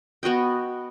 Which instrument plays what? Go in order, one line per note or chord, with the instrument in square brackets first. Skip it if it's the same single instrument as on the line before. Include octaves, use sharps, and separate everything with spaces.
[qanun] B3 F#4 D#5 G5